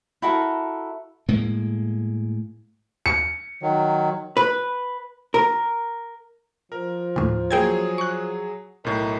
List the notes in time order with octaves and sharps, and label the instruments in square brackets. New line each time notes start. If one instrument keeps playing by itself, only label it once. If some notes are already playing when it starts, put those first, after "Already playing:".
[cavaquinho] E4 F#4 A4 A#4
[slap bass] A2 G#3 A#3
[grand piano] C#7
[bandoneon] D#3 F#3
[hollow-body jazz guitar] B4
A#4
[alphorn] F3 [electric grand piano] A#4
[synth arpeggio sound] D#2 A2
[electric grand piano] F#3 G#4 C#5 [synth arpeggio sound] A#3 G5 G#6
[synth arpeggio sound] C#6 F#6
[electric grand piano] B1 A2 [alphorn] A#4